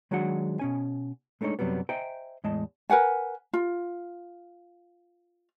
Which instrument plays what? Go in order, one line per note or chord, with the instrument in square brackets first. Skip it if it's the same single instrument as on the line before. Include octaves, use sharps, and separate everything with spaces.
[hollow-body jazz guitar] D#3 F#3 G#3 D4 F#4 F#5
B2 C#4 G#5
G#3 A3 D4 D#4 C#5
F#2 C3 F#3 G3 B3
C5 D#5 E5 G5 G#5 A#5
E2 A2 G#3 D#5 A5
[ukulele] A#4 B4 F#5 G#5
F4